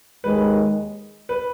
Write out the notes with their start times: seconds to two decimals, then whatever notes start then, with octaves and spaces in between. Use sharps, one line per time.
0.24 D#2 D#3 G#3 B4
1.29 B4